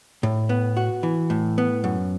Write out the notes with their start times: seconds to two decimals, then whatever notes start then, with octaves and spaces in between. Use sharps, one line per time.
0.23 A2
0.49 B3
0.77 F#4
1.03 E3
1.30 A2
1.58 B3
1.84 F#2